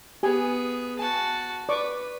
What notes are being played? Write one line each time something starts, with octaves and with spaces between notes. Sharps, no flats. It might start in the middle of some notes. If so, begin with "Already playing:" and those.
B3 G4 G#4 G#5
F#4 G#5 A5
B4 D5 C#6 D6